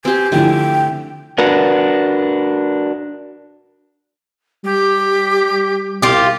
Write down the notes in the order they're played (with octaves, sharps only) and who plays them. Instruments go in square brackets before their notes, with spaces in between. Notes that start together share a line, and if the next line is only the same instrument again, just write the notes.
[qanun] C4 G4 [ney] G#5
[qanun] D3 A3 [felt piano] F3 E4 [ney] G5
[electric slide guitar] D4 F#4 A#4 B4
[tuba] G3 [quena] G4
[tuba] C2 [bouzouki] F4 G4